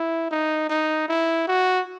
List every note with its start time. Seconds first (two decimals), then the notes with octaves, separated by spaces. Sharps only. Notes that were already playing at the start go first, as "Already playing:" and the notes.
Already playing: E4
0.31 D#4
0.69 D#4
1.08 E4
1.47 F#4